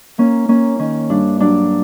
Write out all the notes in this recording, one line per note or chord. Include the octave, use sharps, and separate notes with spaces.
A#3 C#4
A#3 C#4
D#3 C#4
G2 D4
F#3 D4